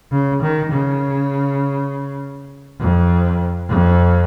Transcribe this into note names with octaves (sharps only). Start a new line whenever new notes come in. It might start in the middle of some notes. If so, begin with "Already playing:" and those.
C#3
D#3
C#3
F2
F2